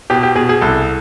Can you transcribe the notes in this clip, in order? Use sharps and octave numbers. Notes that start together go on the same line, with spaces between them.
B2 G4
G4
B2 G#4
G#4
C2 A4